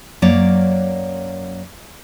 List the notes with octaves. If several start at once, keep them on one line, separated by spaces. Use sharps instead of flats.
F#2 F#3 A#3 C#5 D5